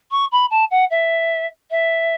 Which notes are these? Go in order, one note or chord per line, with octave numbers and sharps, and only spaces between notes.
C#6
B5
A5
F#5
E5
E5